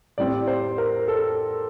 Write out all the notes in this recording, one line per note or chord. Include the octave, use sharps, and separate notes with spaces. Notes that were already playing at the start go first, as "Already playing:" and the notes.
A2 G3 C4 D5
C5
A#4
A4